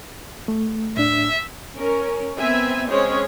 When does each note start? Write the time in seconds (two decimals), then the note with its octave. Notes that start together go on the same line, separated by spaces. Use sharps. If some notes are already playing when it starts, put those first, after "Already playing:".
0.48 A3
0.97 A2 D4 E5
1.77 C#4 A#4
2.39 B3 C4 E5 G#5
2.89 G#3 C4 C#4 G#4 C5 C#5